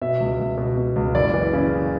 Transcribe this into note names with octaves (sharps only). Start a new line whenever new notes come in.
B2 E5
C#2
C#2
B2
B2
C#2
F#1 D5
E3
C#3